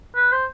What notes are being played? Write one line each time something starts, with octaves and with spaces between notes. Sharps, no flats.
B4
C5